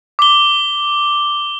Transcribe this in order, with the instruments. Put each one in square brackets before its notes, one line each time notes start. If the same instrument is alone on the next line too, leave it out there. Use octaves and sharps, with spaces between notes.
[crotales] D6 G7